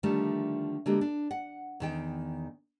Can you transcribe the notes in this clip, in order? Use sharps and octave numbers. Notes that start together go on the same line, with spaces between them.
D3 D#3 F3 G3 A3
D3 G#3 A#3 B3 F#4 G4
D4
F#5
E2 D#3 G5